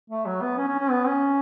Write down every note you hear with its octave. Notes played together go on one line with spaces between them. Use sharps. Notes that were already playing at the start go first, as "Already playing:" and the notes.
A3
F#3
B3
C#4
C#4
C#4
B3
C#4